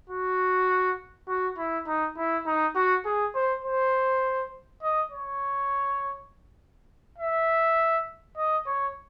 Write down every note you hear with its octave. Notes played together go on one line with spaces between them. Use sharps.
F#4
F#4
E4
D#4
E4
D#4
F#4
G#4
C5
C5
D#5
C#5
E5
D#5
C#5